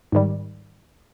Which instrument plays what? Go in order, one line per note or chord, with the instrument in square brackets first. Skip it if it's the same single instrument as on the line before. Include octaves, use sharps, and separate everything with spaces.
[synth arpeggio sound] G#2 D#3 G3